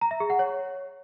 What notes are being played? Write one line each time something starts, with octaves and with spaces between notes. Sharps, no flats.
A#5
E5
G#4
F#5
C#5